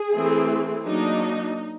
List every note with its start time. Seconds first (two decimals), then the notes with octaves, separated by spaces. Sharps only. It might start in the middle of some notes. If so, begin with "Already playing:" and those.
Already playing: G#4
0.14 E3 A3 C4
0.86 F#3 A#3 D4 D#4